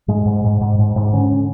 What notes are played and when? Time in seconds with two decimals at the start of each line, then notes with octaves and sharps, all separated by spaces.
0.08 G#2 G#3
0.26 G#2
0.44 G#2
0.61 G#2
0.79 G#2
0.96 G#2
1.13 D3 C#4
1.31 D3